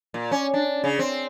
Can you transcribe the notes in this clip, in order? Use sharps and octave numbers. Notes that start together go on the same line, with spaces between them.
A#2
C#4
D4
C#3
C4